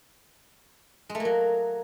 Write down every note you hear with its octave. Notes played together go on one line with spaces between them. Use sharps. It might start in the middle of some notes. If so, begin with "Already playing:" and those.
G#3
A3
A#3
F#3